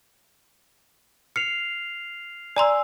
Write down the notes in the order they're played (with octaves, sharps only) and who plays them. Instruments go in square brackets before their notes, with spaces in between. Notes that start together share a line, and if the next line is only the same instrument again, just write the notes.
[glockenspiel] F6 C7 F7 [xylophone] C#7
[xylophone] D5 A#5 C6 [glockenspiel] G#5 E6